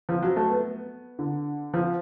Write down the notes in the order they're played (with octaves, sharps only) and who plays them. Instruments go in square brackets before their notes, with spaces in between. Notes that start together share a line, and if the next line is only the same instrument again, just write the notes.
[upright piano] F3
F#3
A3
B3
D3
F3